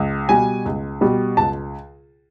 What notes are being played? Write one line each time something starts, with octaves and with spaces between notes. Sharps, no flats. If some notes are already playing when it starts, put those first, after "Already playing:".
Already playing: C#2
B2 G3 G#5
C#2
B2 G3
C#2 A5